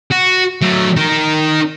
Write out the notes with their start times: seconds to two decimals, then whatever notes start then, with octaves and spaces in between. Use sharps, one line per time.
0.11 F#4
0.62 F#3 A3
0.97 D#4 A#4